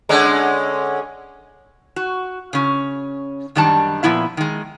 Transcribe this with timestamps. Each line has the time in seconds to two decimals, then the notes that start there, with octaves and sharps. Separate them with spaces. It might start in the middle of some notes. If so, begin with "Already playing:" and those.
0.09 D3 G#3 C#4
1.96 F#4
2.53 C#3 C#4
3.55 F#2 D#3 G3 D4 A5
4.03 A#2 F3 B3 E4 E5
4.37 D#3 G#3